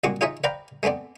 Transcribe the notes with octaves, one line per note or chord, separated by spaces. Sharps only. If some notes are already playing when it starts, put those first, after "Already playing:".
C2 A#2 G#3 F#4 C#6 D6
D#4 F4 G#4 C#5 D#5 E5
B4 C5 D5 F5 G5 A#5
G#3 A3 B3 C4 D5